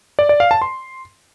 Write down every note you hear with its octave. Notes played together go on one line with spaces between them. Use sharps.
D5
D5
F5
A5
C6